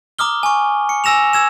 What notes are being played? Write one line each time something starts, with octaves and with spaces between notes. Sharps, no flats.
A#5 D6 D#6 F6 G7
G#5 C#6
C#7
G#5 E6 A#6 E7 F7
E6 G#6 E7